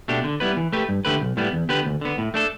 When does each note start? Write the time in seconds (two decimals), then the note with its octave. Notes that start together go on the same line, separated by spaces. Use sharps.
0.08 B2 A3 D4 G4
0.24 D3
0.40 G3 B3 E4 B4
0.57 E3
0.73 A3 G4 B4
0.89 G2
1.05 D3 A3 G4 B4
1.21 B1
1.37 A2 G3 B3
1.53 E2
1.69 D3 B3 G4 B4
1.85 D2
2.01 D3 B3
2.18 A2
2.34 A3 D4 A4